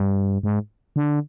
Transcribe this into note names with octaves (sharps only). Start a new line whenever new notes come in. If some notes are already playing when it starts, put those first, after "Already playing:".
Already playing: G2
G#2
D3